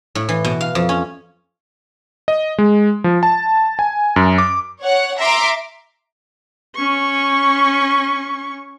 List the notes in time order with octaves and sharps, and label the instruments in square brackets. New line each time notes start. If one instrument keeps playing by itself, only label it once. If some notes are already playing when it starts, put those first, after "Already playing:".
[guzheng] A2
E3
B2
F5
F2
C#4
[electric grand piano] D#5
G#3
F3
A5
G#5
F#2
D6
[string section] C#5 F#5
E5 A#5 C6 D6
[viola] C#4 C#6